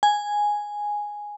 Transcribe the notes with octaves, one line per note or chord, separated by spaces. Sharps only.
G#5